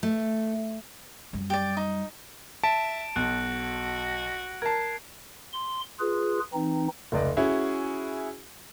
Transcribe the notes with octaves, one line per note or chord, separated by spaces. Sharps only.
A3
F#2 G3
G4 D5
D#4
E5 A5 D7
B1 F#4 F#6 D7
A#4 A5 G#6 C7
C6
F4 G#4 B4
E3 C4 D#4
F1 C#2 D5 D#5
C#4 E4 F#4 G#4